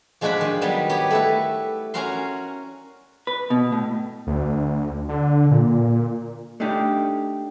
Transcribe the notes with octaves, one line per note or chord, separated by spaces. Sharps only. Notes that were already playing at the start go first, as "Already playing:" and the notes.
F3 G#3 D4 F#4 F#5 B5
D#3
F#3 G3 B3
B3 G4 C#5
A3 E4 B4
C#4 F#4 A#4 F#5 A#5 C6
B4
B2
A2
D2
D3
A#2
A3 D4 D#4 G4